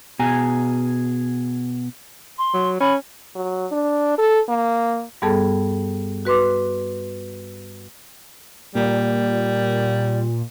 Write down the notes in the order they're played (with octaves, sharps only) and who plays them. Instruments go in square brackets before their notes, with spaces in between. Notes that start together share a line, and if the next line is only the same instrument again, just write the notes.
[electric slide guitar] B2 G#4 G#5 A#5
[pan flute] C6
[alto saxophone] F#3
[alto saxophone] C#4 [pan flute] B5
[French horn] F#3
D4
A4
A#3
[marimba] G2 G3 B3 G#4 A4 A5
F#4 B4 C6 D6
[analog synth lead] A#2 [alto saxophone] G3